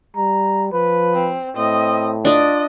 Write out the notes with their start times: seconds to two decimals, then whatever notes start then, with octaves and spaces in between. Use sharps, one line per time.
0.16 G3 A#5
0.73 F3 B4
1.14 C4
1.56 A2 C4 D#5
2.25 D4 F4 D5 D#5